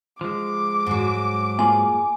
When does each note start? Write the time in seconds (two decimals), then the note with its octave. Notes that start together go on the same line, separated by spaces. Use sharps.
0.21 F3 G#3 D6
0.86 G#2 F#3
1.59 A#3 F4 G#4 G#5